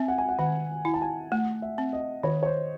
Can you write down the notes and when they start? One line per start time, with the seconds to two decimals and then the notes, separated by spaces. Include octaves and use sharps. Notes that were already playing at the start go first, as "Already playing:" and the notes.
Already playing: C4 E5 G#5
0.08 F#5
0.18 G#5
0.29 F#5
0.39 D#3 F#5
0.85 E4 G#5
0.94 A5
1.02 G#5
1.32 A3 F#5
1.62 E5
1.78 C4
1.93 D#5
2.23 D#3 C#5
2.43 C#5
2.46 C5